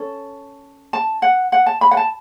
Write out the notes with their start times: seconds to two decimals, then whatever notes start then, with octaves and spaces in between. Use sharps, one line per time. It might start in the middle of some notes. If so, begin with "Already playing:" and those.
Already playing: C#4 A4
0.93 A5
1.22 F#5
1.52 F#5
1.66 A5
1.81 B5
1.91 F#5
1.97 A5